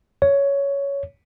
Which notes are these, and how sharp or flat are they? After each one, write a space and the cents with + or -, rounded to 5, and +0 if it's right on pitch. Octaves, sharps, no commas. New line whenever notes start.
C#5 +10